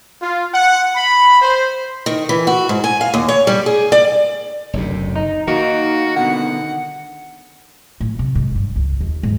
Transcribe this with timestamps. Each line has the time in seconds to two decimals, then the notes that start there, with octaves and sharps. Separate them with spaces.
0.22 F4
0.53 F#5
0.95 B5
1.41 C5
2.06 D#3
2.29 E3
2.47 F#4
2.69 G#2
2.84 G#5
3.01 F5
3.14 D#2
3.29 C#5
3.47 G3
3.66 G#4
3.92 D5
4.73 F#1 D2 C3
5.16 D#4
5.47 D#3 A#3 D#4 F#4
6.16 B2 D3 F#5
8.01 A2
8.19 C3
8.35 G#2
8.55 G2
8.76 C#2
9.01 D#2
9.23 G#2